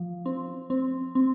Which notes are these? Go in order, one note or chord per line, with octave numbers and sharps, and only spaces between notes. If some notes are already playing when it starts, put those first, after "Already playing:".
Already playing: F3
C4
C4
C4